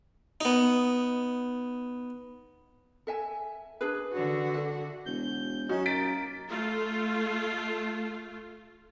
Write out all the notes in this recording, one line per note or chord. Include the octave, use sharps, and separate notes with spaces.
B3 D#4
A4 E5 G#5
D4 G#4 B4
D3 F#4
A4 E5
E1 G6
F#2 C#4 D#4 F#4
A#3 A6 B6 D7
A3 F4